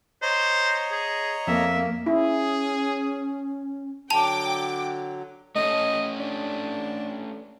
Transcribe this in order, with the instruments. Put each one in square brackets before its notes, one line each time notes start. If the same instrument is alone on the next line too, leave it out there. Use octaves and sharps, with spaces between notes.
[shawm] C5 [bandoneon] C#5 D#5 A#5
[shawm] G#4
[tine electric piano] F2 [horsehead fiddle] A#3 [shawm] E5
[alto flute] C#4 [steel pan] E4 [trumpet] G#4
[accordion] D3 F#3 [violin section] G5 D6 [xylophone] A5 F7
[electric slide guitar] A3 C#4 A4 [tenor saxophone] D#5
[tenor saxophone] D4